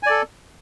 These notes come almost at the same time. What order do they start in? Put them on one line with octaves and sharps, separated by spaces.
G#5 D5 A4